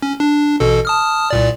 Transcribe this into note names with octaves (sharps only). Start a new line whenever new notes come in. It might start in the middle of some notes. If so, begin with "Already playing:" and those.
C#4
D4
A1 B2 A4
A5 D#6 F6
C2 A#2 D5